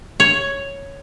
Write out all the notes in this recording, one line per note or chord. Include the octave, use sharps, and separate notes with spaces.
C#5